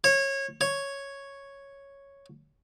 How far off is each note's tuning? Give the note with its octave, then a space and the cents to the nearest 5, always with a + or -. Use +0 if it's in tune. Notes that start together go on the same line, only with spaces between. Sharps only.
C#5 -20
C#5 +0